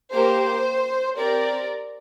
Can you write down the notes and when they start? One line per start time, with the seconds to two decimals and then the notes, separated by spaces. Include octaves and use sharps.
0.12 A#3 G4 C5
1.18 C4 G4 A#4 D5